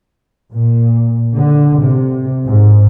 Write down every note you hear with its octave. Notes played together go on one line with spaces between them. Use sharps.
A#2
D3
C3
G#2